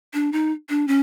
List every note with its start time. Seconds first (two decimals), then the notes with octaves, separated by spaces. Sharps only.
0.14 D4
0.32 D#4
0.69 D4
0.88 C#4